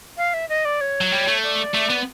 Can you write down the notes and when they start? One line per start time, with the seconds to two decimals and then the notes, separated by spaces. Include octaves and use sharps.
0.18 F5
0.34 E5
0.49 D#5
0.65 D5
0.81 C#5
1.01 F#3
1.12 G3
1.27 A3
1.43 D5
1.74 A3
1.90 B3